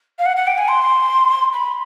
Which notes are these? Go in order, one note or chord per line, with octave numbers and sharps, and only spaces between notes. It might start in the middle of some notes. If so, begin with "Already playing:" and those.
F5
F#5
F#5
G5
G#5
C6
B5